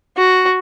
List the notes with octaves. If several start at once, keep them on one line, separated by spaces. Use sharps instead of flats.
F#4